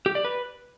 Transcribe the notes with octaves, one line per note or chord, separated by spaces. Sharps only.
G4
D5
B4